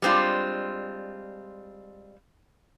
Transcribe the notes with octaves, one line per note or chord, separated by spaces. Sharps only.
G3 G#3 C4 D4 F4